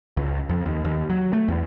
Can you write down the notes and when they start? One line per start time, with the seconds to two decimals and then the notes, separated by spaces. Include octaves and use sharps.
0.17 C#2
0.49 F2
0.66 D#2
0.85 D#2
1.10 F#3
1.33 A3
1.48 E2